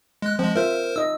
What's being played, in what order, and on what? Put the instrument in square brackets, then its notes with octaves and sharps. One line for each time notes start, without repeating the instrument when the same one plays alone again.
[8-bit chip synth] G#3 F#6
[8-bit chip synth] F3 G#3 [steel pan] C4
[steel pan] F4 E5 [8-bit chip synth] A#4 C5
[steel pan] D#4 D#5 [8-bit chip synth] E6